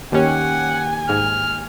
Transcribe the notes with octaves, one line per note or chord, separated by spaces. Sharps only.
D#2 D#3 A#3 C#4 G4 F#5 G#5
G#2 F6